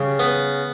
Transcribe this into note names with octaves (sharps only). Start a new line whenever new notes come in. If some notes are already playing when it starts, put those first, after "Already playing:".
Already playing: C#3 G3
B3